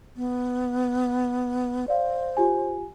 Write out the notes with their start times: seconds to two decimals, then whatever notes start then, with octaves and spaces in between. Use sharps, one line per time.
0.16 B3
1.88 C5 D5 F5
2.37 F4 G4 G#5